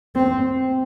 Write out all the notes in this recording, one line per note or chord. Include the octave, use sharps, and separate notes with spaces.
C4